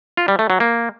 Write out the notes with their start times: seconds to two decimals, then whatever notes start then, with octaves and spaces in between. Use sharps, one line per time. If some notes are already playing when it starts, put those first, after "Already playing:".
0.17 F4
0.28 G3
0.39 A3
0.50 F#3
0.60 A#3